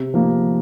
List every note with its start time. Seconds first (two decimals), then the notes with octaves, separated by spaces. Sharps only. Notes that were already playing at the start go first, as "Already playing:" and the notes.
Already playing: C3
0.14 F3 A#3